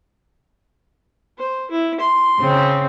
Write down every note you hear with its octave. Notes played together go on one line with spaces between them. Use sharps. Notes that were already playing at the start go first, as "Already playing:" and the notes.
C5
E4
C6
C#3 C4